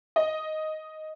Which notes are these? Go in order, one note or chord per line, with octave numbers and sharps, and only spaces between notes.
D#5